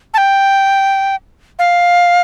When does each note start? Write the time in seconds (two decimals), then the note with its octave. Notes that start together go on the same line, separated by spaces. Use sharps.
0.14 A5
0.18 G5
1.59 F5